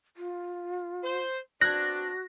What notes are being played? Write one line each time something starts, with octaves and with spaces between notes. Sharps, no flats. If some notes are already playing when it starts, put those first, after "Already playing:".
F4
C5
B3 C4 D4 F#4 F#6 G#6 A#6